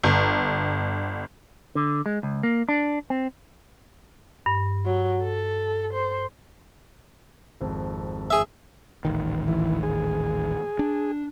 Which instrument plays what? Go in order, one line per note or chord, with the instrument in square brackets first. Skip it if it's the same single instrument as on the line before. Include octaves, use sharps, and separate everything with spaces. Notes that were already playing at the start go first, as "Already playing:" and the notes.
[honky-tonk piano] G1
[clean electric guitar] D3
G#3
C#2
A#3
D4
C4
[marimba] G2
[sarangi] F#3
A4
C5
[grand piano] G#1 F2
[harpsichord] G#4 E5
[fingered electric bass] D#1 A1 D#3
[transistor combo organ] E3
G#4
[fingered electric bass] D4